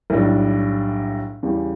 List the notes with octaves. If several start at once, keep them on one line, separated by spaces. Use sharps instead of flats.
B1 A2 G3 D4
E2 C#3 G3